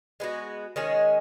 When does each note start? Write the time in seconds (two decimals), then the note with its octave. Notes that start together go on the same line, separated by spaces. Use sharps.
0.20 G#3 B3 F#4
0.76 D#3 G#3 C#4 G#4